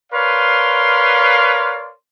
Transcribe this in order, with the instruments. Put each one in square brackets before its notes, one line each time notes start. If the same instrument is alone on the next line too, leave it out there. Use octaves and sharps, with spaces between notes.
[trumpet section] A#4 B4 C#5 D5 F5 C6